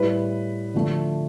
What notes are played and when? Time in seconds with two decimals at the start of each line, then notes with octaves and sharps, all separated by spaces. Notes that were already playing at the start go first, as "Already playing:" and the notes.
Already playing: A2 G3 B4
0.74 D3 F3 A3